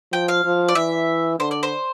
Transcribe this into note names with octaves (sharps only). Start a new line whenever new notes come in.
F3 G5
F5
F3
D5
E3 E5
D3 C5
D5
C5